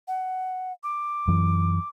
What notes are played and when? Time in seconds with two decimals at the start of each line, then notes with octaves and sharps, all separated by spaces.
0.08 F#5
0.83 D6
1.28 F#2 E3